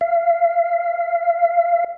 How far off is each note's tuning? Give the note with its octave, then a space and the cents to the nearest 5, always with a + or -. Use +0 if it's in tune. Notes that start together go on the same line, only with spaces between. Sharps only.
F5 -35